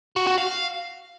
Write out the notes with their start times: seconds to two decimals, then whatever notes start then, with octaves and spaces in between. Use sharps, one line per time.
0.16 F#4
0.27 F#4
0.38 F5